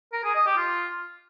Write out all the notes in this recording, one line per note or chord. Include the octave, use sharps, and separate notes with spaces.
A#4
G#4
D#5
G4
F4